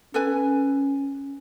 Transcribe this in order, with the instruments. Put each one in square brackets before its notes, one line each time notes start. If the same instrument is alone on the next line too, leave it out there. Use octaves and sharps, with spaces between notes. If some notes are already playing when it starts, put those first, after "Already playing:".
[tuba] C#4 [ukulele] A4 B4 G#5